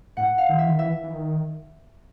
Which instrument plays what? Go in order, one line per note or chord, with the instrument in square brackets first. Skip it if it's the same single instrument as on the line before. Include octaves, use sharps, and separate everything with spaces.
[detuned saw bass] A2 [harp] F#5
[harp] F5
[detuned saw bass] D#3
[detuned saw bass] E3 [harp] E5
[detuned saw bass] D#3
[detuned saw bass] E3 [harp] E5
[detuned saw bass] E3
D#3